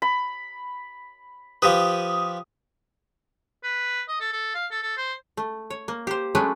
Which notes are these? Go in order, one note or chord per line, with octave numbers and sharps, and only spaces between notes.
B5
F3 G4 B4 D#6
B4
D#5
A4
A4
F5
A4
A4
C5
A3
C#5
A#3
G4 C5
F#3 G#3 A3 C#4 D4 B4